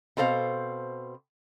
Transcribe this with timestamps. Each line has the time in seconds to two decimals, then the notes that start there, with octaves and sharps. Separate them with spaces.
0.17 B2 C4 A4 C5 F5